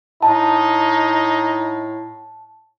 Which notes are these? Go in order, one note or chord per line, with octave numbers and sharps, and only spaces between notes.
A2 D#4 A5